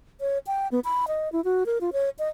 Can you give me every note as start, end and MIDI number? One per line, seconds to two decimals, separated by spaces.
0.21 0.38 73
0.47 0.68 79
0.72 0.80 59
0.84 1.05 83
1.08 1.31 75
1.32 1.43 64
1.44 1.64 66
1.66 1.78 70
1.81 1.90 65
1.93 2.10 73
2.19 2.29 75